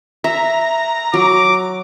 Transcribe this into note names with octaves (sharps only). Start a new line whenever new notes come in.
E5 A#5
F#3 D6